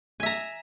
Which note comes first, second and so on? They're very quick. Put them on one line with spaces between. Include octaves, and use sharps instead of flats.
G#5 E5 A#5